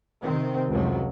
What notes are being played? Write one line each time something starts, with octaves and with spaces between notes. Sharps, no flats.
C3 D#3 C4
F1 C#2 C3 F3 F#3